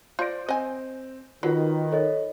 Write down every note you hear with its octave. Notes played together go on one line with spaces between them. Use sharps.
F4 C5 D5 G6 A#6 D7
C4 D#5 G#5
D#3 F#3 F4 F#4 B4
A4 C#5 D#5